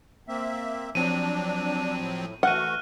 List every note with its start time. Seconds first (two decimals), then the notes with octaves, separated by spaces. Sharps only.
0.28 A#3 C4 E5
0.95 F3 F#3 C4 D4 D#7
1.99 A2
2.43 E3 A3 F#4 F#5 F6 F#6 D#7